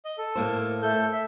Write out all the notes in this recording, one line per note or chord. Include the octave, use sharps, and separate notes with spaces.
D#5
A4
A2 A#3 C5
A3 A4 G6
E5